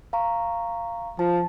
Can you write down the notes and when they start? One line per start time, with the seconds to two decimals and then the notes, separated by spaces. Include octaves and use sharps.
0.13 F5 A#5 C#6
1.19 F3 A5